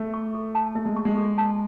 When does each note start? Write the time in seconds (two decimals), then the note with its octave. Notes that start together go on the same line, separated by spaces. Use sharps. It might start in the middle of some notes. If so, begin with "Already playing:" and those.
Already playing: A3 E5
0.14 C#6
0.34 A4
0.55 A5
0.75 A3 E5
0.85 G#3
0.96 C#6
1.05 G#3
1.16 A4
1.38 A5